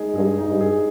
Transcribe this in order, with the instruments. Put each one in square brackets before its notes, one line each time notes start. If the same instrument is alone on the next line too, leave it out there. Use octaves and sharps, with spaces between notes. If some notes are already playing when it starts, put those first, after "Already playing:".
Already playing: [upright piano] G#3 D#4 G#4
[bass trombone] G2 [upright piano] G#4
[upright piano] D#4
[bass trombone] G2
[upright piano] G#4